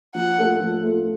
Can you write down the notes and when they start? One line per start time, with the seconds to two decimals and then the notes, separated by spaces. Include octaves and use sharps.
0.15 F3 F#5
0.38 A3 F4 A4
0.60 F3
0.83 A3 F4 A4